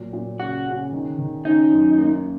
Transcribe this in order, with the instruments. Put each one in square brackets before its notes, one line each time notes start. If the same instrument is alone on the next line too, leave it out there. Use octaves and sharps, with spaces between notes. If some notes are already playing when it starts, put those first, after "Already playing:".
Already playing: [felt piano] A#2 F#3
A#2
[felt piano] C#3 [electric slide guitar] F#4
[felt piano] C#3
D#3
D#3
[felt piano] C#4 [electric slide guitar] D#4
[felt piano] F#2
A#3